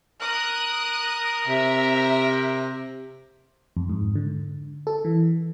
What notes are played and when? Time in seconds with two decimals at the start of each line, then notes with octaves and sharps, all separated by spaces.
0.21 A#4 D#6 F#6
1.47 C3 E5
3.77 F2
3.89 G#2
4.16 D3
4.87 A4
5.05 E3